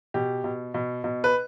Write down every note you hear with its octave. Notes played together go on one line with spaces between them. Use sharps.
B2 G4
B2
B2
B2
B4